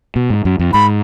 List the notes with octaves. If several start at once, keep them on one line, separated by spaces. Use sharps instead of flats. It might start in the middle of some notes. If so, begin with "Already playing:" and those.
B2
G#2
F#2
F2
G#2 B5